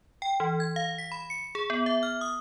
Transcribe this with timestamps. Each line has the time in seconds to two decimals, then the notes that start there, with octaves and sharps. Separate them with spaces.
0.22 G5
0.40 E3
0.60 G#6
0.76 F5
0.98 B6
1.12 B5
1.30 C#7
1.55 G#4
1.70 B3
1.86 E5
2.03 F6
2.21 D#6